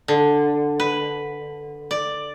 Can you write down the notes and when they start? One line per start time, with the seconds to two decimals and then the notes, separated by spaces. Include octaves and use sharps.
0.08 D3
0.80 B4
1.91 D5